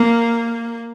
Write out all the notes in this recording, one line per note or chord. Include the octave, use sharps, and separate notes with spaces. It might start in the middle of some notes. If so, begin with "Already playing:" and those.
Already playing: A#3